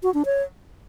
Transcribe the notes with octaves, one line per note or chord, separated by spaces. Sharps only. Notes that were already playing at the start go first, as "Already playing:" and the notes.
F#4
D4
C#5